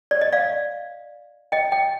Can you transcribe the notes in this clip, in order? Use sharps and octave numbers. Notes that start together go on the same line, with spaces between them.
D5
D#5
D5 F5
D#5 G5
D#5 G5